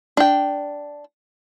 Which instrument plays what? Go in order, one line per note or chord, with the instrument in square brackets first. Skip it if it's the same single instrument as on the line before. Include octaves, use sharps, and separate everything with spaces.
[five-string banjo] D4 G5